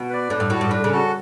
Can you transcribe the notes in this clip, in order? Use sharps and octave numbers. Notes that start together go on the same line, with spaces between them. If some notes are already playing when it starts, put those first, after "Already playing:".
Already playing: B2
B4 D5
A2 D4
G2
A2 F#4 A4
G2
A2 D4
C#3
F#4 A4